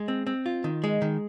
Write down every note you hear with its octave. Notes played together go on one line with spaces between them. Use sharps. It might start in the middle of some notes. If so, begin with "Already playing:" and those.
Already playing: G#3 D#5
C4
C4
F4
D#3
G#3
D#3